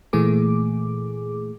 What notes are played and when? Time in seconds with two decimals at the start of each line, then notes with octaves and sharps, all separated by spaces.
0.13 A#2 E3 A3 G#4 D6